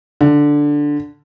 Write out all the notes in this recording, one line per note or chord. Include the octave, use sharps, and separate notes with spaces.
D3